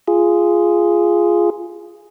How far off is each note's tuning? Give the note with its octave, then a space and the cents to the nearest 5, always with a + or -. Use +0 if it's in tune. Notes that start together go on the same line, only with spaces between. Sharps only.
F4 -10 G#4 +0